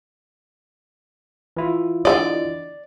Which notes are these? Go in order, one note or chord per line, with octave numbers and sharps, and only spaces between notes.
E3 E4 F4
D3 A3 D5 D#5